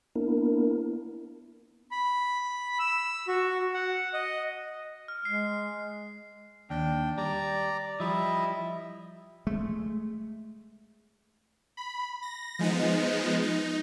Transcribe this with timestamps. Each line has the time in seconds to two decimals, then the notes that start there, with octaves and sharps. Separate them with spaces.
0.15 A#3 B3 D4 E4 A#4
1.91 B5
2.79 E6
3.28 F#4
3.74 F#5
4.14 D#5
5.08 F6
5.25 G#3 C7
6.70 D#2 D4 G5
7.18 G3 D5 A#5
8.00 F3 G3 E4 D#5 E5
9.47 G#3 A3
11.77 B5
12.22 A#6
12.59 F3 G#3 B3 D#4
13.42 D#4